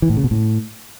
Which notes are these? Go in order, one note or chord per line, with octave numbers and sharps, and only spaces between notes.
E3
A2
C#3
B2
A2